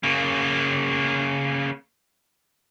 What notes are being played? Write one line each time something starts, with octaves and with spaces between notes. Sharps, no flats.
C#3 A#3